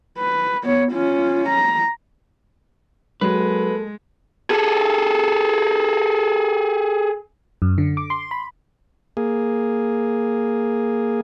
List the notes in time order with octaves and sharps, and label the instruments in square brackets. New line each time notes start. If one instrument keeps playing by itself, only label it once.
[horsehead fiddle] B4
B3 C#5
C#4 F4
A#5
[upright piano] F#3 [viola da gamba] G#3 [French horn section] A#3 A4 [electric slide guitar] B4
[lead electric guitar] G#4 A4
[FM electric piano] F#2
D3
D6
C6
B5
[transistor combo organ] A#3 G#4